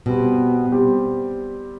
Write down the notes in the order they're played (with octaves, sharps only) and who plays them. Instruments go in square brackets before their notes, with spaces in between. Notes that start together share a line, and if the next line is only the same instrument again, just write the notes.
[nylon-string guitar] B2 [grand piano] G3 C4 G4
[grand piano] G3 C4 G4